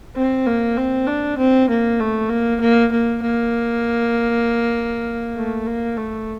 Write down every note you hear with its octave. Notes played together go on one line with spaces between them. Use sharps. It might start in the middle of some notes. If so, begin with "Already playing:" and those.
C4
A#3
C4
D4
C4
A#3
A3
A#3
A#3
A#3
A#3
A3
A#3
A3